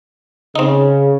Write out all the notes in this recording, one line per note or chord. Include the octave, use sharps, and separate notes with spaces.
C#3 C4 D#4